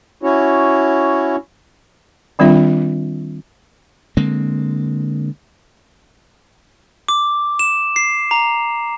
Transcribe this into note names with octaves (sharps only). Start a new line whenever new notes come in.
C#4 E4 F#4 C#5
D#3 G3 C4 D4 F4 E5
D3 G#3 A#3 C4
D6
E7
C7
A#5